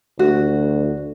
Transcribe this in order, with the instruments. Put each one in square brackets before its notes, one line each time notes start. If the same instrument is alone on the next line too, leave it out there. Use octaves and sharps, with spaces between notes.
[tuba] D2 [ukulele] F#4